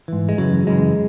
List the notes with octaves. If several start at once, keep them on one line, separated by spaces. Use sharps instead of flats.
G#2 E3
G#3
F#2 C#3 E3 F#3
F#2 C#3 E3 G#3